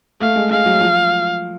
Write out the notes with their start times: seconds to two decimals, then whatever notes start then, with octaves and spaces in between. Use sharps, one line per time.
0.21 A3 F5
0.36 G#3
0.51 G#3 F5
0.66 F#3
0.81 F3